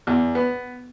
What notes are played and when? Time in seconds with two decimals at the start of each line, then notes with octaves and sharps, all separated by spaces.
0.07 E2
0.35 B3